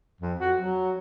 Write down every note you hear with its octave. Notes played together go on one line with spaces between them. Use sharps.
F2
F#4
F#3